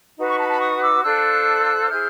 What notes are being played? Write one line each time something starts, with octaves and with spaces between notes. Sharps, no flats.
D#4 F#4 B4
B5 C#6
A5 B5
A5 B5
C#6 D#6
D6 E6
D4 F4 A4 C5 E6 F#6
E4 G#4 C5 F6 G6